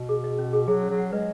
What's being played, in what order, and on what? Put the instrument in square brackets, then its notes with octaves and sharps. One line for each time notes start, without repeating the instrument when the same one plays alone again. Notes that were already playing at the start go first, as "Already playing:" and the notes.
Already playing: [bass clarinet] B2
[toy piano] G#4
D#5
C#4
G#4
[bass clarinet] F#3 [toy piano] G#4
[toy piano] C#4
[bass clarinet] F#3
[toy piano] F#5
[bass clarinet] G#3 [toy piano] B4